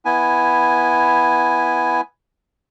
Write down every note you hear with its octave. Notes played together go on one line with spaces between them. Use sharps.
B3 E4 G#5